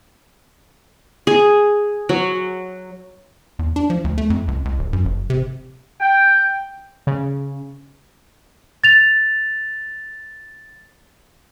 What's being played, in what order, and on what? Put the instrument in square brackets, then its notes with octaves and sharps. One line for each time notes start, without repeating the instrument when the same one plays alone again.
[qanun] G#4
F#3
[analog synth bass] E2
D4
F3
D2
A3
F2
C#2
C#2
D1
F#2
F#1
C3
[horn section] G5
[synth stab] C#3
[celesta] A6 F7